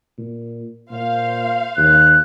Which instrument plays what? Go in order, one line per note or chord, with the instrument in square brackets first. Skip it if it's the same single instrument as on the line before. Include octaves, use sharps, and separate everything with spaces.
[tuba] A#2
[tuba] A#2 [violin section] C5 F5
[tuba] D#2 [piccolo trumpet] F#6